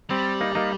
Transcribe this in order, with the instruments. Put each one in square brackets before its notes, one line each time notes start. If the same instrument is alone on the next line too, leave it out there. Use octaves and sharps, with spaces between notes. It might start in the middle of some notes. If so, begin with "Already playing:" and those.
[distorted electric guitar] G3 [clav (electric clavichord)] C4
[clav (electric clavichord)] A#3 D#4
A#3 D#4